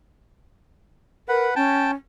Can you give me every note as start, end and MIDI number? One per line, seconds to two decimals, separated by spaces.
1.29 1.49 70
1.29 1.54 71
1.29 1.54 78
1.56 1.93 61
1.56 1.91 79
1.56 1.91 81